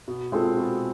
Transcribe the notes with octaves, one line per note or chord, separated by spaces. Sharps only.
B2
G#3 C4 F4 A4
B2